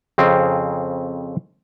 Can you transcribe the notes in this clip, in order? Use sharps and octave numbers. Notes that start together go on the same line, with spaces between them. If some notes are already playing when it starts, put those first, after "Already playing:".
F2 C#3 C4 G#4